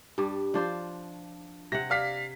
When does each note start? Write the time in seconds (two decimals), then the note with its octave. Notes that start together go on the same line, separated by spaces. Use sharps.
0.18 G2 G3 D4
0.54 F3 D4 C5
1.72 C3 F#5 A#6
1.90 D5 F5 B6